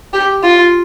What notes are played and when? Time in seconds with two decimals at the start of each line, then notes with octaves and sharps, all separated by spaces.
0.13 G4
0.43 F4